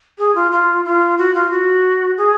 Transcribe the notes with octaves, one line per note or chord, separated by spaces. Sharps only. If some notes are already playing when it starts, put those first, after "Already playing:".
G#4
F4
F4
F4
F#4
F4
F#4
G#4